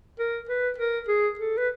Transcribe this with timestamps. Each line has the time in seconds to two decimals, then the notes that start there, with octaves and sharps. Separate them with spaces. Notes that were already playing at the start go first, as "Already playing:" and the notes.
0.19 A#4
0.49 B4
0.78 A#4
1.08 G#4
1.39 A4
1.57 B4